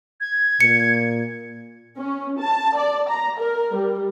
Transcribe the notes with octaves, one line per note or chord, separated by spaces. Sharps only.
G#6
A#2 C#7
C#4
A5
D5
A#5
A#4
G3